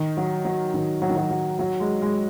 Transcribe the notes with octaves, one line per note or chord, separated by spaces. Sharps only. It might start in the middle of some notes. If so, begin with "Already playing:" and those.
Already playing: D#3
F#3
F#3
D#3
F#3
D#3
F#3
F#3
F#3
G#3
G#3